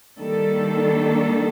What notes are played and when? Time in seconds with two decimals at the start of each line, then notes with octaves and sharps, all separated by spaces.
0.18 D#3 G3 A#3 D4 A4